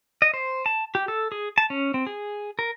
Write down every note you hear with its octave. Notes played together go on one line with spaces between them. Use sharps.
D#5
C5
A5
G4
A4
G#4
A5
C#4
C4
G#4
A#4